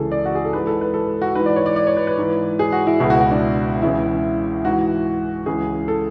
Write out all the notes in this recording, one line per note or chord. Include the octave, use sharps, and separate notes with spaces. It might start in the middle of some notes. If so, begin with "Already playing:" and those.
Already playing: C#2 C#3 E3 G#4 A4
D5
F#4
G#4
A4
G#2 E3 B4
A4
B4
A4
F#4
G#2 E3 B4
D5
C#5
D5
D5
C#5
B4
B4
G#2 E3
G#4
F#4
E4
C#2 B2 E4
F#4
F#4
D4
C#2 C#3 E3 E4
G#2 E3 F#4
C#2 C#3 E3 G#4
A4